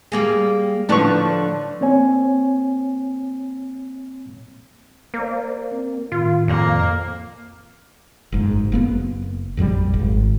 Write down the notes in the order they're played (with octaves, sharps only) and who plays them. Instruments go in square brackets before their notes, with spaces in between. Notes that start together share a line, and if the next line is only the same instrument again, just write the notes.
[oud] G3 A#3 G#4
[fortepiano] A2 B4 C#6 [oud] D3 F3 D4
[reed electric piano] A#3 C4 C#5 G#5
[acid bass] A#3 [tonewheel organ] A#4 C5 D5
[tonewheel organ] C4
[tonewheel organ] A2 D#3 [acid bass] F4
[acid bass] F2 [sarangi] A#3
[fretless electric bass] F#1 G#2
F#1 A#3 B3
A#1 F2 F#3 G3
G#1